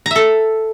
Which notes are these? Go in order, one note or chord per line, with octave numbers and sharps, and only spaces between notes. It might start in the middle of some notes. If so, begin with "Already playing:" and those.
A4 E5 A#5